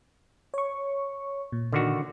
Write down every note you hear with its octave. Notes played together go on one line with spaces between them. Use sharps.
C#5 C#6
A#2
D3 D#3 F#4